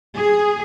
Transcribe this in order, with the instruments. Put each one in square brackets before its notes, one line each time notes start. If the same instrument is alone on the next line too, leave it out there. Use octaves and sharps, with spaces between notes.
[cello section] G#4